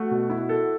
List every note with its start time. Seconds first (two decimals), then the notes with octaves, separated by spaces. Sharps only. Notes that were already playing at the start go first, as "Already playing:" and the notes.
Already playing: A3 F#4
0.11 B2
0.30 E4
0.49 A4